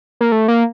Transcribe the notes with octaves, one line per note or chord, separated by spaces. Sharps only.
A#3
A3
A#3